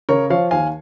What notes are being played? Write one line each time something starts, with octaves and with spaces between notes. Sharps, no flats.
C#3 A#4 C#5
F3 C#5 F5
D#2 F5 G#5